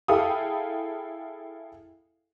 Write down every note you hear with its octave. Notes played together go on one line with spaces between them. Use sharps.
E4 G#4 A4 F5 G5 D#6